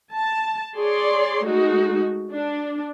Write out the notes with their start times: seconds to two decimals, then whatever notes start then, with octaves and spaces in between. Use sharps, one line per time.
0.14 A5
0.78 G#4 C#5 D5 C6
1.46 G#3 A3 D#4 F#4
2.32 D4